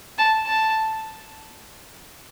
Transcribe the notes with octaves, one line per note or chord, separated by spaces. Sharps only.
A5
A5